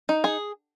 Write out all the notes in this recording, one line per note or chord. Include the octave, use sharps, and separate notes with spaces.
D#4
G#4